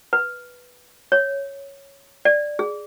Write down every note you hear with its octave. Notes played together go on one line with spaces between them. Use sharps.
B4
C#5
D5
G#4